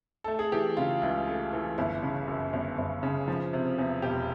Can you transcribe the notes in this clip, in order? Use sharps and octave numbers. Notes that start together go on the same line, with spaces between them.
A3 A4
G#4
E3 G4
C#3 F4
C#2 E4
A3
E3
G1 E4
C#3
F#2
G1
G1
C#3
F3
C3
E2
E1 G4